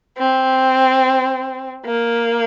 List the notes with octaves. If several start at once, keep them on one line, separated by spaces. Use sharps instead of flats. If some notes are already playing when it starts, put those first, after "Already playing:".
C4
A#3